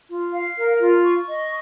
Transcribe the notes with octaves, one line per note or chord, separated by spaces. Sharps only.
F4
F5
A#4
F4
C#6
D#5